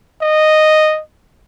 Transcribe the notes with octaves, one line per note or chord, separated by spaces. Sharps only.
D#5